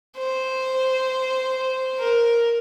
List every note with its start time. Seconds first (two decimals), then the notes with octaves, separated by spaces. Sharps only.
0.18 C5
1.99 A#4